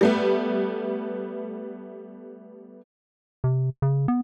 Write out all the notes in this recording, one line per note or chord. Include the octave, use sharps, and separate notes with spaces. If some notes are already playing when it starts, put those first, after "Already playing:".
G3 A3 B3
C3
C#3
B3